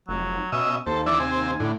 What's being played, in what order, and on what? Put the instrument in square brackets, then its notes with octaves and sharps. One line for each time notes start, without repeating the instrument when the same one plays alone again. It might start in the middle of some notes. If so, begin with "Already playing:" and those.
[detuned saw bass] F1 [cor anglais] F#3
[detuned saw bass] B2 [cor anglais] C#4 [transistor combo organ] D#5 E5
[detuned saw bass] D#2 [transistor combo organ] A4 [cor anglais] C5
[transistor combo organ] E3 D4 E4 [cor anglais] D5
[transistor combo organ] C3 C4 [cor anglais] G#5
[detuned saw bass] A2 [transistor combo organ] D3